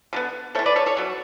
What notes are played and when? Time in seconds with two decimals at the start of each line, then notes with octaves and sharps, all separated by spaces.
0.13 D3 G#3 B3
0.55 E3 A3 A4 C#5
0.66 B4 D5
0.76 A4 C#5
0.86 A4 C#5
0.97 B2 F#3